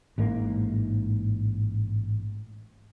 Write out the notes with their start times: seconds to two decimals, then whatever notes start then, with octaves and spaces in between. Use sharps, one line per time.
0.18 A1 G#2 A#3